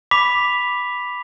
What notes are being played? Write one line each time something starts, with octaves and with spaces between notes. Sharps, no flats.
B5 D6 B6 F7